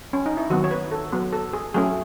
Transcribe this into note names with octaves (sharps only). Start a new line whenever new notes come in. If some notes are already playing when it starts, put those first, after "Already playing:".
C#4
D#4
E4
D#3 F#3 B3 F#4
C#5
B4
A4
F#3 B3
A4
G#4
F#3 A3 C#4 G#4